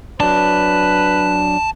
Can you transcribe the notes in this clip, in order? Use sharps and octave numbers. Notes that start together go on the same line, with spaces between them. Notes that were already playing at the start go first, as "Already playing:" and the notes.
F#3 D4 B4 A5